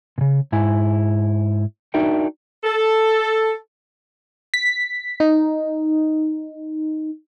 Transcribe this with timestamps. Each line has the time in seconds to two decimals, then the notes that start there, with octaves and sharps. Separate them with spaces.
0.18 A#2 C#3
0.52 G#2 E4 G#5
1.94 D4 D#4 F#4 A#4 E5 G5
2.64 A4
4.54 B6
5.20 D#4